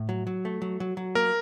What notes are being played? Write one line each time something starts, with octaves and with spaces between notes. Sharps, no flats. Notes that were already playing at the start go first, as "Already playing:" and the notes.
Already playing: A2
F#3
F#3
A3
F#3
F#3
F#3
A#3 A#4